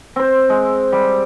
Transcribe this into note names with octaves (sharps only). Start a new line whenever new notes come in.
C4 C5
G#3
G3